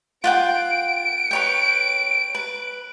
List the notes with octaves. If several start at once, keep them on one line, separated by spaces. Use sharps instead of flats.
F4 F#5 G5 D7
B4 C#5 G5
B4